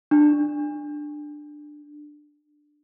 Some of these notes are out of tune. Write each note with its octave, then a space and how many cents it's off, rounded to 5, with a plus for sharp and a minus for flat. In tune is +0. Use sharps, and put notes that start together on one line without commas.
D4 +15